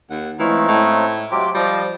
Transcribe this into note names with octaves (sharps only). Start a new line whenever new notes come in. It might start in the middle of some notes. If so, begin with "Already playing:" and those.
D#2 F#5
E3 F3 G#3 A3 C4 C#4 D#4
A2
C3 F#3 G#3 F4 G4 D6
F3 G3 D#5